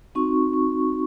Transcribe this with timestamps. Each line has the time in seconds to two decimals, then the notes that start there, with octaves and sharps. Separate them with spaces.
0.15 C4 D#4 F#4 C#6
0.53 C#6